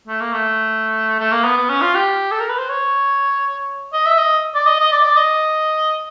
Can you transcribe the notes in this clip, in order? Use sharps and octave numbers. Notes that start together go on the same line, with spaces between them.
A3
A#3
A3
A3
A#3
B3
B3
C#4
F4
G4
A4
A#4
B4
C5
C#5
D#5
E5
D#5
D5
D#5
D#5
D5
D5
D#5